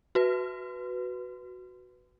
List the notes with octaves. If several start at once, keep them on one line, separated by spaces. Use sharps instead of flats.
F#4 B4